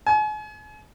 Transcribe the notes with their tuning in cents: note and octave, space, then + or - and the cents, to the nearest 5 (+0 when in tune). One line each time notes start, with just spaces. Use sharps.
G#5 +40